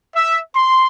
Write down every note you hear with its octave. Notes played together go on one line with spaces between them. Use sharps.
E5
C6